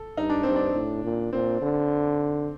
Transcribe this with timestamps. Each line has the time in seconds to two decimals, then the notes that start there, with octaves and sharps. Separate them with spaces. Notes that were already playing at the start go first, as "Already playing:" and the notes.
Already playing: A4
0.17 G2 D#4
0.30 D4
0.43 G2 C4
0.56 D4
0.75 A2
1.04 A#2
1.33 A#2 C4
1.62 D3